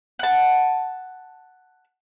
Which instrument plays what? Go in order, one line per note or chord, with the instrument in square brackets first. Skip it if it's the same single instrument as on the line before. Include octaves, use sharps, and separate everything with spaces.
[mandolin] F#5 A5